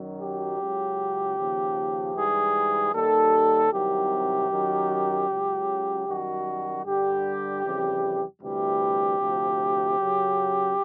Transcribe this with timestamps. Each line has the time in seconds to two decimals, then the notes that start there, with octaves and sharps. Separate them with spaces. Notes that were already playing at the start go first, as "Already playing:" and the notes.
Already playing: F#2 D#3 F#3
0.20 G4
0.59 C#2 C#3 F#3
1.37 D#2 C#3 F3
2.15 G#2 E3 G3 G#4
2.93 D#2 D#3 G3 A4
3.72 C2 C3 D#3 F#3 G4
4.49 F#2 D#3 F#3
5.29 C#2 C#3 F#3
6.06 F#2 D#3 G3 F#4
6.84 G2 D3 G3 G4
7.63 F2 C#3 E3 G3
8.41 D2 C3 E3 G3 G4
9.19 D2 C3 F3
9.98 F#2 C#3 F#3